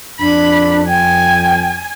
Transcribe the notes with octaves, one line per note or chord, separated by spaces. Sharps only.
F2 D4 B5
G5 G#5